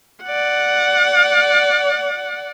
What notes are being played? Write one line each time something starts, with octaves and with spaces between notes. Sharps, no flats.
D5 F#5